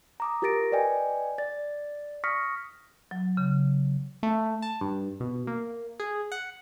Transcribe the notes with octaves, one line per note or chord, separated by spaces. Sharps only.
A#5 D6 D#6
F4 G4 A#4 A6 A#6 D7
B4 D5 D#5 G5 G#5
D5 A6
C#6 D#6 F6 A#6 B6 C#7
F#3
C#3
A3
A5
G2
B2
A#3
G#4
F#5